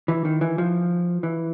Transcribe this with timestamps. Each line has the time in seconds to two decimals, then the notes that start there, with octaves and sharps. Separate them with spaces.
0.08 E3
0.25 D#3
0.41 E3
0.58 F3
1.23 E3